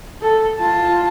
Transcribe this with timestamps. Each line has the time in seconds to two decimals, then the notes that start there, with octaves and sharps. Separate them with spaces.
0.22 A4
0.59 F4 A5